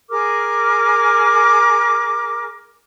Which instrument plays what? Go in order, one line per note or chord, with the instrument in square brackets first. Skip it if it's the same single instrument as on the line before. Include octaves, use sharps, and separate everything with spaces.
[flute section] G#4 A#4 D6 F6